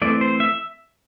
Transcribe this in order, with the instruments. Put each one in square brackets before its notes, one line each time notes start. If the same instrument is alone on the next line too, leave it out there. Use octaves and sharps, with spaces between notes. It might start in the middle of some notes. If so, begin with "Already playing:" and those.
[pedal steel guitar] E3 A3 C4 D5
C5
E5